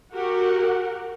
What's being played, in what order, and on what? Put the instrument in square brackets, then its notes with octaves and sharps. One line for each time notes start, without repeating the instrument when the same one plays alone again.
[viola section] F#4 G4 A#4 F#5